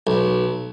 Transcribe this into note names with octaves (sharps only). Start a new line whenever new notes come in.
B1